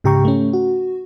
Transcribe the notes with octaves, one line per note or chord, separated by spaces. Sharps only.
G#2 C#3 G4 G5 A#5 C#6
A3 C#4
F#4